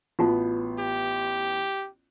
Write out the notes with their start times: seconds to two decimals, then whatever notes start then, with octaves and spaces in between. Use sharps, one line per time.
0.19 A1 B3 F4 F#4 A5
0.79 G4